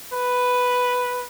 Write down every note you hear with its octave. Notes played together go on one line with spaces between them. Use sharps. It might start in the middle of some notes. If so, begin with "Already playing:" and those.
B4